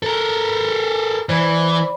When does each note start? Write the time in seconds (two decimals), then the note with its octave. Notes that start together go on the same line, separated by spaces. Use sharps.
0.03 A4 A#4
1.29 E3 C5 D5 B5